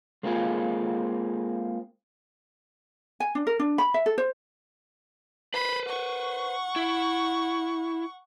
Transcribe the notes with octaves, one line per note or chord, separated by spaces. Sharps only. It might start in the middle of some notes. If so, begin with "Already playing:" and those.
G#3 A#3 C4 F4 G#4
G#5
D4
A#4
D4
B5
E5
A4
C5
B4 C5 B5
F#5 C#6
E4